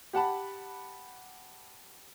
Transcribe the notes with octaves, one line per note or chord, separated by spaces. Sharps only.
G4 F#5 A5 B5